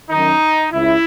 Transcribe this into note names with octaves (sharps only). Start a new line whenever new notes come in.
F#2 D#3 D#4
C#2 C#3 E4